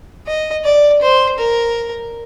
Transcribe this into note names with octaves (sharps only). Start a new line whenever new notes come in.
D#5
D5
C5
A#4